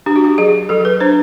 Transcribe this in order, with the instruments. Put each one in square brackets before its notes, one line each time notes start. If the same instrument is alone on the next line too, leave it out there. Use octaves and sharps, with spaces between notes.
[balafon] D4 G4
F#4
G4
F#3 G#4
F#3 A4
B4
D4 C5